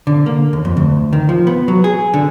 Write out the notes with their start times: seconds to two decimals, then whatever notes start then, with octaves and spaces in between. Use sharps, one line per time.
0.07 D3
0.26 A#3
0.53 D#2
0.65 F2
0.77 D2
1.13 D#3
1.29 F3
1.47 B3
1.68 F#3
1.84 G#4
2.14 D3